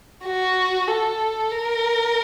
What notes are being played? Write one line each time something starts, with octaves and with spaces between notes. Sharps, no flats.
F#4
A4
A#4